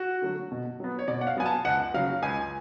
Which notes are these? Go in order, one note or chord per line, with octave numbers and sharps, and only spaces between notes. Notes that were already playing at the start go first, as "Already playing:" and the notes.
Already playing: F#4
D3 F#3 A3
B2
F#3 B3
C#5
B2 D5
F#5
F5
F#3 B3 G#5
A5
C#2 F#5
C#3 F#3 F5
C#2 G#5